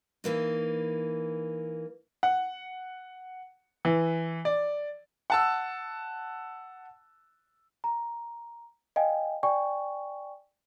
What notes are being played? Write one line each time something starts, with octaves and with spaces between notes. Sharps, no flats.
E3 A#3 D#4
F#5
E3
D5
F#5 A5 E6
A#5
D#5 F5 G5 G#5
D5 G5 G#5 C#6